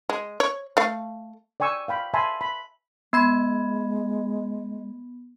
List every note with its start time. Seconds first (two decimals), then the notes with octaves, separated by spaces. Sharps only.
0.09 G#3
0.40 C#5
0.77 A3 F5
1.60 D5 G5 G#5 C#6 E6
1.88 F5 G5 B5
2.14 E5 G#5 A5 B5 C6
2.41 B5
3.13 G#3 B3 B5 G#6